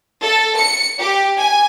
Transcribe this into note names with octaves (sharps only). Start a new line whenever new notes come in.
A4
C#7
G4
G#5